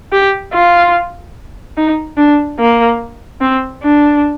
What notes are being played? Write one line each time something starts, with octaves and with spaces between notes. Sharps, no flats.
G4
F4
D#4
D4
A#3
C4
D4